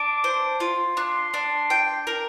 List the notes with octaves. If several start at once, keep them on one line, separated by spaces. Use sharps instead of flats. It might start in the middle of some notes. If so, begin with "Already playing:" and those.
Already playing: D4 D6
C5
F4
D4 C6
D4
G5
A#4